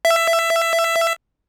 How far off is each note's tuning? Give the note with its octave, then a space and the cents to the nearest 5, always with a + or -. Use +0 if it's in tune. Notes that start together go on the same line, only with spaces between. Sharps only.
E5 +15